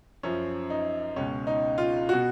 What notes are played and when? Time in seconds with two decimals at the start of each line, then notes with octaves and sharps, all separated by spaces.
0.23 F#2 F3 C#4
0.70 D#4
1.16 C#2 B2 C#4
1.47 D#4
1.78 F4
2.09 B2 F#4